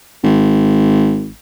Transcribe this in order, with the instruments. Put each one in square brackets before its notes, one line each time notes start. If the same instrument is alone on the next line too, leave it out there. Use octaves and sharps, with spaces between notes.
[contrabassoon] G#1